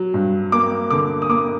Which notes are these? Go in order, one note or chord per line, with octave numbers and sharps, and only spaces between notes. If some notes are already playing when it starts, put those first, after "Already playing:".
Already playing: F#3
G2
A#3 D6
D3 D6
D#6
A#3 D6